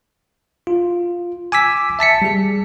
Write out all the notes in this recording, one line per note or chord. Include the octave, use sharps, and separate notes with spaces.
F4
G#5 D6 E6 B6
E5 A5 B6 C#7
G3 G#4